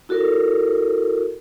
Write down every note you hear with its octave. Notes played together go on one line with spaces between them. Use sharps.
E4 F#4 A4 A#4